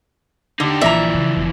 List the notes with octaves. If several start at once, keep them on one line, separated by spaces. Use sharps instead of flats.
D3 D#4 G4
A#1 E3 F3 D5 E5 A#5
C#3
E1